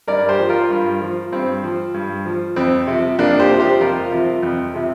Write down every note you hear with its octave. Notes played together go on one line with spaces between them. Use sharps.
G2 A#4 D5
A#4
G4 C5
F3
F4 A#4
G2
F3
G2 C4
F3
G2
F3
F2 C4
C3 F3
F2 A#3 D4
G4 C5
C3 F3
G4 C5
F2 F4 A#4
C3 F3
F2
C3 F3